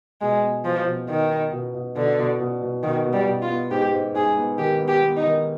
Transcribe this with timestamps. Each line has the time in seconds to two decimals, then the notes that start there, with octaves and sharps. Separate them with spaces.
0.21 B2 G#3
0.44 B3
0.65 B2 F3
0.86 B2
1.09 B2 D#3
1.30 B3
1.52 B2
1.75 B2
1.96 B2 D3
2.19 B2
2.40 B2
2.62 B2
2.83 B2 D#3
3.05 B2
3.13 G3
3.27 B2
3.42 F4
3.50 B3
3.71 G#2 G4
3.92 G#2
4.14 G#2 G#4
4.37 B3
4.58 D#3 G4
4.81 B3
4.88 G4
5.02 B3
5.17 D#4
5.24 D#3